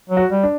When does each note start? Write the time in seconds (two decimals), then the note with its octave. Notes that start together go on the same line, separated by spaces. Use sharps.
0.10 F#3
0.17 F#4
0.30 G3
0.43 D4